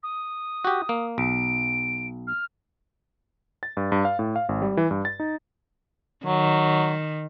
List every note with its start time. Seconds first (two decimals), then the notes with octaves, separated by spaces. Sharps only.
0.03 D#6
0.65 F#4 G4
0.89 A#3
1.18 B1 D7
2.27 F6
3.63 A6
3.77 G2
3.92 G2
4.05 F5
4.19 A2
4.36 F5
4.49 G#1
4.62 G3
4.77 E3
4.91 G2
5.05 A6
5.20 D#4
6.26 D#3 F#3